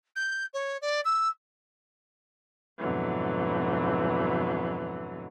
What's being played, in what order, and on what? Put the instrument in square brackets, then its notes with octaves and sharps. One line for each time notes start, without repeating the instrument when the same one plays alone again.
[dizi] G6
C#5
D5
E6
[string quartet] F2 G#2 B2 D3 E3 F#3